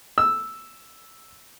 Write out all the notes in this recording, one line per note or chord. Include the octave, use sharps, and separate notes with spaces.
E6